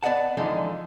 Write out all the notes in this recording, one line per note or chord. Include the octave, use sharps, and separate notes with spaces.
B3 D5 D#5 F#5 A5
D3 E3 F3 G#3 D#4